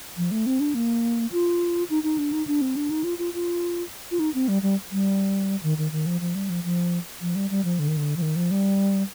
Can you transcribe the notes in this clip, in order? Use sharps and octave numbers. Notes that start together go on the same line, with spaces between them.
F3
A3
C4
D4
A#3
F4
D#4
D#4
D4
D#4
D4
C4
D4
D#4
F4
F4
F4
F4
D#4
C4
G3
G3
G3
D#3
D#3
D#3
F3
F3
G3
F3
F3
F3
G3
G3
F3
D3
D#3
D3
F3
D#3
F3
G3